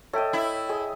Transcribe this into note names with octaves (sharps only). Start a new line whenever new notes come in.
A4 C#5 D#5 E5 G5
E4
G#4 D#5